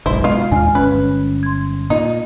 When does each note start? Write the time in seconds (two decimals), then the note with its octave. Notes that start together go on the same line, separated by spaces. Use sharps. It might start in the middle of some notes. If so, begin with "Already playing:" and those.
0.06 F#1 B1 G#2 E4 C5
0.24 B2 G#3 F4 F5
0.52 D#2 A#2 D4 G#5 F6
0.75 G1 C#4 B4
1.43 C6 G#6
1.90 A#2 D#4